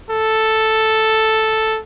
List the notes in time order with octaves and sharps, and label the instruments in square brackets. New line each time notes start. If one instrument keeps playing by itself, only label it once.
[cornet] A4